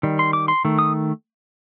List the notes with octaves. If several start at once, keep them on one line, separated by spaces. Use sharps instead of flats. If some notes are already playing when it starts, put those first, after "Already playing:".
D#3 G3
C6
D6
C6
D#3 A3
D#6